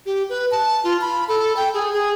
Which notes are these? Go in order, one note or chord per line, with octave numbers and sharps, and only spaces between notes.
G4
B4
A5
F4
B5
A4
G5
G#4
G#4